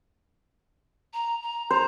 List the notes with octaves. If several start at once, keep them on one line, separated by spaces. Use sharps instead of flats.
A#5
A#5
C5 A#5